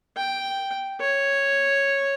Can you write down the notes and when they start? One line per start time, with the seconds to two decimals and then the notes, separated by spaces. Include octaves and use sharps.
0.17 G5
1.00 C#5